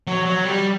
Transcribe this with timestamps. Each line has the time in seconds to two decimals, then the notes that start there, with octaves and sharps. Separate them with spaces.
0.07 F#3
0.26 F#3
0.45 G3